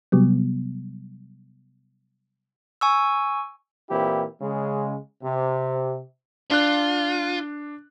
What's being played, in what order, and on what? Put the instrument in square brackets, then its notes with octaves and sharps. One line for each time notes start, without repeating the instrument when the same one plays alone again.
[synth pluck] C3 F#3 G3 B3
[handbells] G#5 C#6 E6
[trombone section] A#2 E3 C4 E4 G4
C#3 G#3
C3
[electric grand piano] D4 F#6 [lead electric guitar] F4